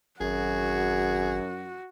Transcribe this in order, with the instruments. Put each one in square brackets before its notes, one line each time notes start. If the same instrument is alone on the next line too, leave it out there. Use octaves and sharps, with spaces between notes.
[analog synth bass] G#1 [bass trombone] F#2 [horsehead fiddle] F#4 [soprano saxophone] G#4